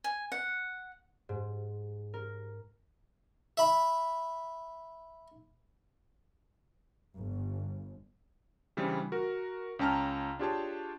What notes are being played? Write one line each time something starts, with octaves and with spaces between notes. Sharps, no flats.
G#5
F#5
G#2
A#4
E5 B5
G1
C#3 E3 G3 C4 D4
F#4 A#4
C#2 C#4 G5 A5 A#5 F6
D4 F4 G4 G#4 C#5 A5